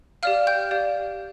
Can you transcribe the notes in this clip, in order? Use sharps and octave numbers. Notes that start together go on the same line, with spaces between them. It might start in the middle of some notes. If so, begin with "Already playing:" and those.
G4 D5 F5 F6
G5 G6
G4 D5 F5